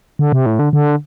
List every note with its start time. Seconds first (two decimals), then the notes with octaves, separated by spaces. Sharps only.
0.19 D3
0.33 C3
0.46 A2
0.59 D3
0.73 D3